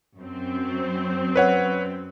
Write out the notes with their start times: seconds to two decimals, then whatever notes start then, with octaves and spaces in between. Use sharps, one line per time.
0.18 F#2 C4
1.36 B4 C#5 F#5